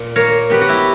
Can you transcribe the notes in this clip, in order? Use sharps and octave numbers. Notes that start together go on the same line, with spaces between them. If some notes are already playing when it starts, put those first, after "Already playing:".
Already playing: A#2
A#3 A#4 C#5
B3 G4 B4
F#4
E4 G4